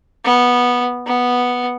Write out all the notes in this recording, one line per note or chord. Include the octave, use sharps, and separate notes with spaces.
B3
B3